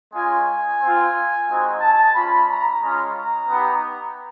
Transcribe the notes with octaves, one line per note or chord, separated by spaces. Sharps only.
G#3 C#4 F4 G#5
G#5
C4 F4
G#3 C4 D#4 F#4
A5
G#3 C#4 F4 B5
A#5
G#3 C#4 F4
A#5
B3 D#4 G4